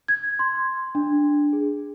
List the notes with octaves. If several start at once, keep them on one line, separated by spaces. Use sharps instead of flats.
G#6
C6
D4
G#4